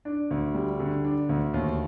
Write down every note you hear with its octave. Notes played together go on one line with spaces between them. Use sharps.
D4
D2
G3
D3
D4
D2
D#2